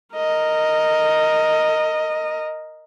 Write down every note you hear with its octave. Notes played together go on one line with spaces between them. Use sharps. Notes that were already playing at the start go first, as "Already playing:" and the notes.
A#4 D#5